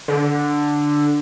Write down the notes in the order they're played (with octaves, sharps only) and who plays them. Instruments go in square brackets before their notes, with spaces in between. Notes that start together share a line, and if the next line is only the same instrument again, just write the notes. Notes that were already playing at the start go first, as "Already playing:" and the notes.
[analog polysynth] D3